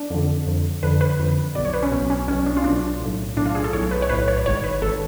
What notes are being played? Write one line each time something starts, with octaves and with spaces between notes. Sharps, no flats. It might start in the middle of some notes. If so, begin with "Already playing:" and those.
Already playing: D4
F2 D3
F2 D3
F2 D3 B4
B4
F2 D3
B1 B2 D5
C#5
B4
C#4
B1 B2 B3
C#4
B1 B2 C#4
D4
F4
B1 B2 D4
B1 A2
B1 A2 D4
F4
G#4
A4
B1 A2 C#5
B4
C#5
B1 A2 B4
C#5
G#1 G#2 C#5
B4
G#1 A4